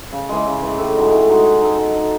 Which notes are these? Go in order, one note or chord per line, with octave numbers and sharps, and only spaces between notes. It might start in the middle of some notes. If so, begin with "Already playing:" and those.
C#3
E3 G#3
C#3
E3 G#3
A2
G#3 D#4 F#4
A2
G#3 D#4 F#4
G#3
D#4 A4
G#3
D#4 A4